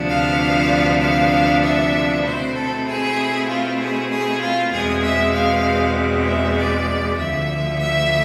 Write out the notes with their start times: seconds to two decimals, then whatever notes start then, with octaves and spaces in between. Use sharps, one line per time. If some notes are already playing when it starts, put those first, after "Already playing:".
Already playing: D2 C3 F3 B3 D4
0.10 F5
1.02 F5
1.64 E5
2.25 B2 A3 C4 E4 C5
2.55 A4
2.87 G#4
3.48 F4
3.79 G#4
4.10 G#4
4.40 F4
4.72 E2 B2 G#3 C4 G#4
5.02 E5
5.33 F5
6.25 E5
6.57 D5
7.17 D2 D3 F3 E5
7.79 E5